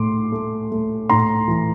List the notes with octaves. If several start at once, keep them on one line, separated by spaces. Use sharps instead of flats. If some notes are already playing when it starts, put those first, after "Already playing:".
Already playing: A2 A3 C6 D6
A3
A3
A2 A#5 C6
E3